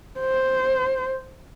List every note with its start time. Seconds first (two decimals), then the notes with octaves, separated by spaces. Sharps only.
0.20 C5